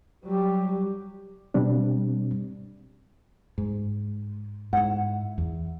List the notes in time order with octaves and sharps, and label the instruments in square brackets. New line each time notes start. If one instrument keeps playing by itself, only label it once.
[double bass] F#3 G3 [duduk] G4
[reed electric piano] B2 G3 C4 D4
[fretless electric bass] G#2
[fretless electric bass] G#2 [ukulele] E4 F#5
[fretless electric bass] E2